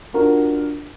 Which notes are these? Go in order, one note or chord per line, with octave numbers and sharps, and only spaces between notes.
D4 F4 F#4 A#4